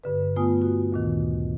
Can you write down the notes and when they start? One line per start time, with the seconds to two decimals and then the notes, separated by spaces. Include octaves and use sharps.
0.04 G2 D3 B4
0.36 A3 B3 F4 G#5 D#6
0.62 F#4
0.92 D2 A#2 D#3